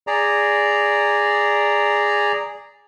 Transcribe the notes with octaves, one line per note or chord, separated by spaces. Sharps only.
G#4 D5 A#5